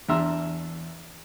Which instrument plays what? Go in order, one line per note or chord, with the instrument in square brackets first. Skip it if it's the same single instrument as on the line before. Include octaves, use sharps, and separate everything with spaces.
[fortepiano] E2 D4 E5 A#5 C6 E6